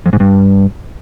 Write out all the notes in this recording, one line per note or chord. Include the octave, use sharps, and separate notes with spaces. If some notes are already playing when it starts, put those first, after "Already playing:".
F2
G#2
G2